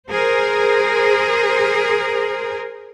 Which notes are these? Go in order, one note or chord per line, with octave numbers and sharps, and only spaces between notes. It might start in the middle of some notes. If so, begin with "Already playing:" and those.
G#4 A#4 C5